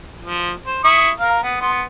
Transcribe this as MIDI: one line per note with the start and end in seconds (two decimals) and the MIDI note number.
0.22 0.51 53
0.66 0.84 72
0.84 1.10 64
0.84 1.10 85
0.84 1.10 87
1.20 1.39 70
1.20 1.39 77
1.43 1.60 59
1.61 1.83 59
1.61 1.83 84